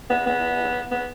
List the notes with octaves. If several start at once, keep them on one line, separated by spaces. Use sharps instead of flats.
B3
B3
B3